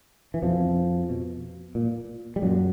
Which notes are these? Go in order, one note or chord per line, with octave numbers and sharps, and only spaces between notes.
E3
F2 B2 F3
B2
A#2
G3
F#2 A#2 F#3